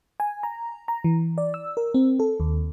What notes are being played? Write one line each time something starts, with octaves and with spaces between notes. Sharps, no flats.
G#5
A#5
A#5
E3
D5
E6
A#4
C4
A4
D#2